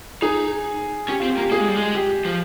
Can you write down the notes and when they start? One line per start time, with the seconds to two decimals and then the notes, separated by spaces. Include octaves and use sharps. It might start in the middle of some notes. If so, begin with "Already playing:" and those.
0.22 D#4 G#4
1.08 C#4 G4
1.20 F4
1.23 C4
1.30 G4
1.37 A#3
1.41 G4
1.51 A#3 G#4
1.60 G#3
1.68 G3
1.76 G#3
1.95 G4
2.25 F3